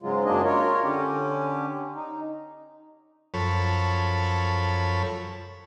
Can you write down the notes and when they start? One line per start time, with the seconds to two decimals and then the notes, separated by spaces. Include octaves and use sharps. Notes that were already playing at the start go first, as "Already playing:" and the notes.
0.03 G#2 C#3 F#3 G#3 F4
0.25 F#2 F#3 A#3 D4 G#4 D#5
0.44 F4 A#4 C#5
0.84 D3 C#4 G4
1.96 D#4
3.34 F#2 F3 A4 C#5 B5